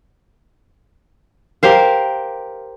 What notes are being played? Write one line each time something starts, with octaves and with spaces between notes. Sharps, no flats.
G4 A#4 C5 F5